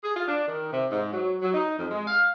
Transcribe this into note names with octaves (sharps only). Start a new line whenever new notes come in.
G#4
F4
D4
D#3
C3
G#2
F#3
F#3
D#4
F2
G#3
F5